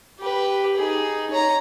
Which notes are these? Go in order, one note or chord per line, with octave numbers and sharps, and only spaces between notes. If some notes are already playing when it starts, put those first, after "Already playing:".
G4 B4
D#4 G#4
C#5 A#5